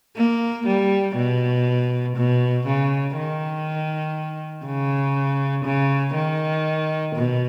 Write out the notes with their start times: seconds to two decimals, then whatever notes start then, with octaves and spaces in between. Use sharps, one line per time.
0.17 A#3
0.66 G3
1.16 B2
2.16 B2
2.67 C#3
3.16 D#3
4.65 C#3
5.65 C#3
6.15 D#3
7.16 B2